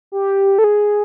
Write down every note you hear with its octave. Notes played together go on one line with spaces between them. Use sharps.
G4
A4
G#4